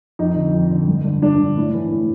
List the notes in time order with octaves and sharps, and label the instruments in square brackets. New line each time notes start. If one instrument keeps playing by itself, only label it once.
[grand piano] F2 D#4
D3
F2
D3
G2
D3
G2 D4
D3
A2
E3
A2